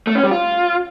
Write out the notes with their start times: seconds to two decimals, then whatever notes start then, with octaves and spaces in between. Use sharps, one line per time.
0.07 A3
0.15 C#4
0.23 G3
0.31 F4